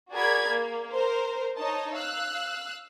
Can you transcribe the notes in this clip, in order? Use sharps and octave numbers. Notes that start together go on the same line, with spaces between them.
F#4 G#4 A#4 D5 B5 G#6
A#3
A#4 C5
D#4 C#5 D#5 A5
F5 E6 F#6